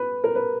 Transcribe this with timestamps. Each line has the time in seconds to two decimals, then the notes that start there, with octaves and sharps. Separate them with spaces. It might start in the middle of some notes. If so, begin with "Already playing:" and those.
Already playing: B4
0.24 A#4
0.35 B4